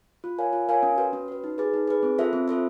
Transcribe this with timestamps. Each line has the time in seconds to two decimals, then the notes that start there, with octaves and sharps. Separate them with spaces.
0.24 F4
0.38 A#4 C#5 F5 G#5
0.53 F4
0.69 A#4 C#5 F5 G#5
0.83 C#4
0.98 F#4 B4
1.13 C#4
1.28 F#4 B4
1.44 D#4
1.58 G#4 B4
1.74 D#4
1.88 G#4 B4
2.03 C4
2.18 F4 A4 C5 E5
2.33 C4
2.48 F4 A4 C5 E5